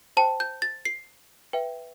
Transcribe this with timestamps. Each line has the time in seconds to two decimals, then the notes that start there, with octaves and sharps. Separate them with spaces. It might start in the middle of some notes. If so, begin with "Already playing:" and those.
0.17 C5 G5 A5
0.40 G6
0.62 A6
0.85 C7
1.53 B4 E5 G5